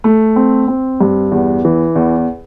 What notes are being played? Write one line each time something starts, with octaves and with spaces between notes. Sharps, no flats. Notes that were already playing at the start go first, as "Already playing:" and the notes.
A3
C4
C4
G2
E2
E3
E2